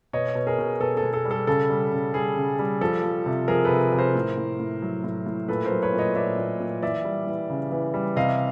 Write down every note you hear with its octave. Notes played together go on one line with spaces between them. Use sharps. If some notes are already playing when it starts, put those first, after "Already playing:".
B2 C#5 D#5
B2
G#4 A#4
B2
B2 A4
A4
B2
A4
G3
A4
C#3 A4
G3
C#3
G3 G#4
C#3
G3
F3 A4
F3
C3
F3 G#4 A#4
A4 B4
C3
C3
A#4 C5
A2
A2
A2
F#3
A2
A2
A#2 A4 B4
A#4 C5
F#3
B4 C#5
A#2
C#5 D#5
A#2 D5 E5
A#2
A#2
E3 D5 E5
G3
E3
C#3
E3
G3
C3 D#5 F5